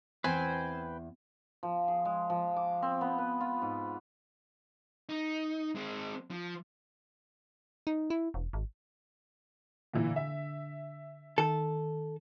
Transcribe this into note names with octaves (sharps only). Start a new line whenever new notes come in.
E2 C4 B4 C5 G5 G#5
F3
G#4
G#3
F3
D6
C4
B3
B4
F4
G#2
D#4
G#3 C4
F3
D#4
E4
E1
G#1
A#2 D3 E3
E5
D#3 A4